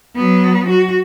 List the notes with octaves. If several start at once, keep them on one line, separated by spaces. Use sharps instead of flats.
F#3 B3
F#4